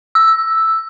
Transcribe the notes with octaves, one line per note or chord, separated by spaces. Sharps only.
E6